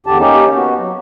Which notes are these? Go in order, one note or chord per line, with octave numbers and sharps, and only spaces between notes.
E2 D3 G4 A5
A#3 C#4 D#4 G4
B3 F#4
F#3